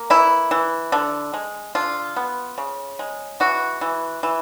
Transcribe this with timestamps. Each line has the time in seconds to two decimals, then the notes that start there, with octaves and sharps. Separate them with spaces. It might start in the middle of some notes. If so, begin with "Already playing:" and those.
Already playing: A#3
0.10 E3 E4
0.51 E3
0.92 D3
1.34 G#3
1.75 D3 F4
2.16 B3
2.58 C#3
2.99 G#3
3.40 E3 F#4
3.81 E3
4.23 E3